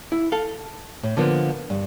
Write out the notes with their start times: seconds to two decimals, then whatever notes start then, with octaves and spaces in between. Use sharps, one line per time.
0.12 E4
0.32 A4 F5
1.03 A2
1.17 D3 F3 A#3 B3
1.70 G2